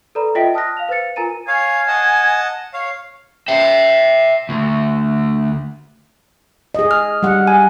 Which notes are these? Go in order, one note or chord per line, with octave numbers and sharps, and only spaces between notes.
A4 B4 D5 A#5 B5
F4 D#5 E5 G5 B6 D7
A5 D#6 F6 F#6 A#6
F5 F7
B4 C5 F5 A6 C#7
F4 A#4 G#5 A#5 A6 D#7
C#5 F5 G#5
D#5 F#5 A5
C#5 F5
E5 G5
D2
G#4 D#5
F6
G3 F#5
G#5